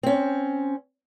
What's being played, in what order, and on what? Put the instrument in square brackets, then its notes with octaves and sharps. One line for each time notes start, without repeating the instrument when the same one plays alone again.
[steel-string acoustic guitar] C4 C#4